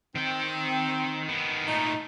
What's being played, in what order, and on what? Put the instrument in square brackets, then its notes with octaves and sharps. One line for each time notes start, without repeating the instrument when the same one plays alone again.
[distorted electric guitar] D#3 G5 [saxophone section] C4
[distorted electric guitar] D#3 B3
[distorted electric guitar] A#2 A3 [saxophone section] D#4